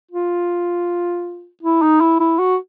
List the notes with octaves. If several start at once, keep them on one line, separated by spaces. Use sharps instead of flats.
F4
E4
D#4
E4
E4
F#4